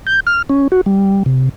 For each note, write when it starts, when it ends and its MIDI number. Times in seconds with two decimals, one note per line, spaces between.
0.07 0.20 91
0.27 0.42 89
0.49 0.68 61
0.72 0.81 66
0.86 1.23 55
1.26 1.49 48